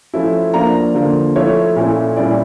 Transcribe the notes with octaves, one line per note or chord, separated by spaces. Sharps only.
F3 A3 C#4 E4
F3 A#3 D4 A#5
D3 F3 A#3
F3 A3 E4 C#5
A#2 A3 C#4 E4
A#2 G3 C#4 E4 D5